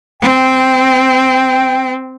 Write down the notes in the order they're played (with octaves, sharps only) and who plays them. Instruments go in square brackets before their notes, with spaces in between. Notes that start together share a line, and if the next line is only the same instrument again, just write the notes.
[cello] C4 [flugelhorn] G5